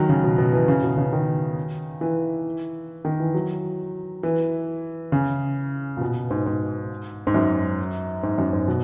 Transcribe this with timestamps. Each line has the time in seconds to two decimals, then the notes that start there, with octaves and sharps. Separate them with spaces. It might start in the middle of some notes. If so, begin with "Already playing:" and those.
Already playing: D#3 F#3
0.09 C#3
0.24 B2
0.38 B2
0.53 E3
0.68 C#3
0.83 B2
0.97 C#3
1.13 D#3
2.01 E3
3.05 D#3
3.20 E3
3.34 F#3
4.23 E3
5.12 C#3
5.97 A#2
6.01 B2
6.31 G#2
6.46 G#2
7.27 G#2
7.34 F#2
8.23 G#2
8.38 F#2
8.53 G#2
8.68 B2